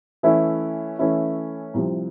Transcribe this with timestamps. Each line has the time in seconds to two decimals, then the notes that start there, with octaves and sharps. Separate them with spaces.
0.23 E3 A3 C#4 E4
0.99 E3 A3 C#4 E4
1.74 C2 C3 F3